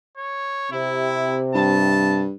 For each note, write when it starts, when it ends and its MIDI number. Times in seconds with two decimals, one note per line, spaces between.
0.18 0.69 73
0.72 2.22 48
0.72 1.39 64
1.55 2.33 43
1.55 2.21 81